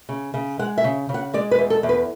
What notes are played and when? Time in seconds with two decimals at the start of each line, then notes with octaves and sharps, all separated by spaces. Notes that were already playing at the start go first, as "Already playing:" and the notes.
0.09 C#3
0.34 C#3
0.59 G#3 F#5
0.78 E5
0.84 C#3
1.09 C#3
1.14 F#5
1.34 G#3 D5
1.51 B4
1.59 E2
1.70 A4
1.83 E2
1.89 B4